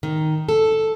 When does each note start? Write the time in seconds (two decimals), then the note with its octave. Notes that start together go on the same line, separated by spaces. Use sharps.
0.03 D#3
0.49 A4